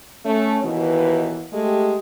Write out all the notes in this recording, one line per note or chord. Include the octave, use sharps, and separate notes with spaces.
A3 C#4
D#2 B2 E3
G#3 A3 G4